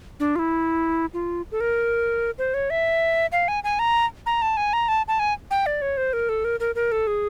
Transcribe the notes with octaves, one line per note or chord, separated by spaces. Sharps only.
D4
F4
E4
F4
A4
A#4
C5
C#5
E5
F5
G#5
G#5
A#5
A#5
A5
G#5
A#5
A5
A5
G#5
G5
D5
C#5
C5
A#4
A4
A#4
A#4
A#4
A4
G#4